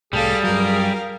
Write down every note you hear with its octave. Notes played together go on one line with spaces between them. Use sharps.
C2 A2 G3 G#4 A4 F5
G2 F#3 A#4 F5